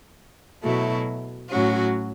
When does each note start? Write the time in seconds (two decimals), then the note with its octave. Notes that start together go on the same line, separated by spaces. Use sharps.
0.63 B2 F#3 A3 E4
1.50 A2 F#3 C#4 F#4